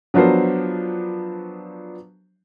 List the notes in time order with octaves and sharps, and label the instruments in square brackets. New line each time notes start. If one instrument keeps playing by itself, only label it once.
[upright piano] F3 F#3 B3 D4 A#4 C5